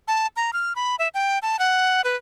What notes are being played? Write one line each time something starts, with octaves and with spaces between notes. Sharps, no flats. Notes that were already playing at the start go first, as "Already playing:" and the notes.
A5
A#5
F6
B5
E5
G5
A5
F#5
B4